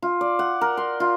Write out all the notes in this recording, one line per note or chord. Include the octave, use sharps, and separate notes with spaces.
F4
D5
F#5
A#4
C6
F4